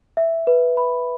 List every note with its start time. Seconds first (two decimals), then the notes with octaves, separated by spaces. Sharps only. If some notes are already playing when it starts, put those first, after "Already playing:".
0.17 E5
0.47 B4
0.77 B5